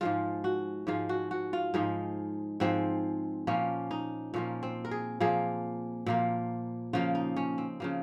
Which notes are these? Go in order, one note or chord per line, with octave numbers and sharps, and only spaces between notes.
G#2 F3 G#3 F4
F#4
G#2 F3 G#3 F4
F#4
F#4
F4
G#2 F3 G#3 D#4
G#2 F3 G#3 C4
A#2 F3 A#3 C#4
D#4
A#2 F3 A#3 C#4
C4
A#4
G#4
A#2 F3 A#3 G#4
A#2 F3 A#3
C#3 F3 A#3 F4
D#4
C#4
C4
C#3 F3 A#3